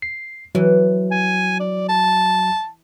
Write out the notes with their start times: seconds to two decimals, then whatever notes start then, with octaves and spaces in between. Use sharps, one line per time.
0.02 C7
0.55 E3 F#3
1.11 G#5
1.60 D5
1.89 A5